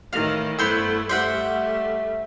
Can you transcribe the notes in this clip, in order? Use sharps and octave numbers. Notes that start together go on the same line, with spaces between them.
A2 D#3 E3 F5
G2 A3 B3 E4 C5 E6
G3 A3 C5 E5 F#5